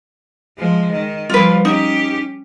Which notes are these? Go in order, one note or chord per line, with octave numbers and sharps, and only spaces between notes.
F3 G#3
D#3
F3 G3 F4 B4
C#4 D#4 G4